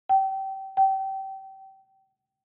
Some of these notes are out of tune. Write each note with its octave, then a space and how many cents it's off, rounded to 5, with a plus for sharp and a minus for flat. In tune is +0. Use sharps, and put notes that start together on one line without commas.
G5 -25
G5 -25